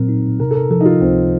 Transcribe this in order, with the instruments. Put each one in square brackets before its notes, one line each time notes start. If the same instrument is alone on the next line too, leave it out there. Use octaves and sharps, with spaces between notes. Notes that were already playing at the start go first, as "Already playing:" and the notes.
Already playing: [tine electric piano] A#2 F#3 C4 [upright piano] A#4
[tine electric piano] D#4
[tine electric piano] C3 [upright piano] A#4
[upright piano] A4
A#4
[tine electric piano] F3 [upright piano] A4
[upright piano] D#4
F4
[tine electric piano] C#2 [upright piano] C4